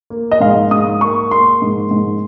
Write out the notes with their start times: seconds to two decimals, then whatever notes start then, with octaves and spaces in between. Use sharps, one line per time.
0.10 A#3
0.32 D#5
0.40 G#2 F5
0.71 G#2 D#6
1.01 A#3 C#6
1.31 A#3 C6
1.62 G#2
1.91 G#2